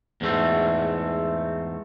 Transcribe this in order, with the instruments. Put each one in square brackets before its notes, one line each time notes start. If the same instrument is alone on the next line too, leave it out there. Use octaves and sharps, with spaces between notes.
[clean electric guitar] E2 G#2 A3 C4